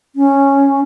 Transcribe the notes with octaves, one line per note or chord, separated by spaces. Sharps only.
C#4